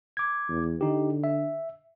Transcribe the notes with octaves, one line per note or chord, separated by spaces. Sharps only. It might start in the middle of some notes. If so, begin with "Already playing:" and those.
D6 G#6
E2
D3 D#4 G4
E5